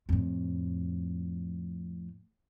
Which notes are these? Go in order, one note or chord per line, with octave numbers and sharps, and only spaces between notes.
F2 A2